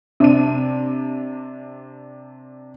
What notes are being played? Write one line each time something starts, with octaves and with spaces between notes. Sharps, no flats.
C3 D4 D#7